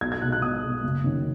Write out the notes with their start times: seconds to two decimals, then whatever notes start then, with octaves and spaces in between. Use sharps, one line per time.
0.01 B1 G#6
0.12 G#6
0.22 B2 F#6
0.26 G#3
0.32 F#6
0.42 B1 D#6
0.63 B2 G#3
0.83 F#1
1.04 F#2 D#3